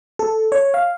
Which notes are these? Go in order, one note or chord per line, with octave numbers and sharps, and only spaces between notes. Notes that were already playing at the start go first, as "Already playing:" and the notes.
A4
C#5
F5